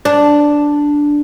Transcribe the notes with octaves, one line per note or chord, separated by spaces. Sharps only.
D4